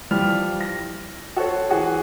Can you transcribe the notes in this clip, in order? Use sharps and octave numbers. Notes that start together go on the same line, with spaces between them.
E3 F3 G3 F6
A#6
F#4 A4 C5 C#5
E3 F#4 G#4